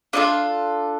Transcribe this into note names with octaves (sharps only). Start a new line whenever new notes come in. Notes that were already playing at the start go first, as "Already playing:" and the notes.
D4 F4 A4 D#5